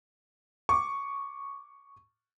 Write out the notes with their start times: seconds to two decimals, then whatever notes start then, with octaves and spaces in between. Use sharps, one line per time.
0.69 C#6 D6